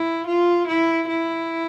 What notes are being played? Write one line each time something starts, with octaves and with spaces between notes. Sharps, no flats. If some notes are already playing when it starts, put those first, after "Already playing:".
Already playing: E4
F4
E4
E4